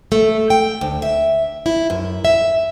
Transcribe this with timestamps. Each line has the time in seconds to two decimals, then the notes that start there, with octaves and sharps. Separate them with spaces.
0.12 A3
0.50 G5
0.81 D2
1.02 E5
1.66 E4
1.90 F#2
2.25 E5